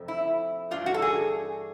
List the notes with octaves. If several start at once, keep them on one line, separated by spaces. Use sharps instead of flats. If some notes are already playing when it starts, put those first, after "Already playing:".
Already playing: F2 C3 F3 A3 C4
E4
G2 E3 A3 D4 F4
F#4
A4
G#4